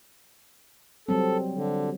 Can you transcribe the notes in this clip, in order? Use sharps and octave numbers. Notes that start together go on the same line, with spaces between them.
F#3 G3 C4 A4
D3